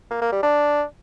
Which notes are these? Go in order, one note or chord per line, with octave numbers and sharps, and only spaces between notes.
A#3
A#3
G3
D4